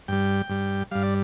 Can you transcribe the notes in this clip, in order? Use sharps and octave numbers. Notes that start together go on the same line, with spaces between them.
G2 G3 G5
G2 G3
G2 G3 F5
D5